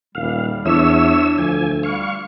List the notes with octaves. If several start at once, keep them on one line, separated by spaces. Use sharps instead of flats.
D#1 G3 F5
E2 D4 C#5 E5 E6
D2 F3 G#5
G3 F5 C#6